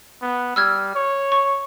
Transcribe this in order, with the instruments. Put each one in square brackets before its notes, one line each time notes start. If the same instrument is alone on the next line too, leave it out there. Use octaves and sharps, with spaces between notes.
[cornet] B3
[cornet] G3 [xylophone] E6 F6 G#6
[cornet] C#5
[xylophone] C#6